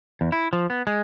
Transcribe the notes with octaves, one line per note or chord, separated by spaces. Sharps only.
E2
E4
F3
B3
G#3